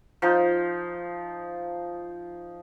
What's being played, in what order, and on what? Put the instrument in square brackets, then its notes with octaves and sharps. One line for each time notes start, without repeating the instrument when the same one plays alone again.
[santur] F3 D#4